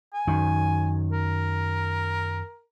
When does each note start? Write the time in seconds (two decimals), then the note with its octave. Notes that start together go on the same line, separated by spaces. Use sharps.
0.13 G#5
0.27 F#2 D#3
1.12 A#4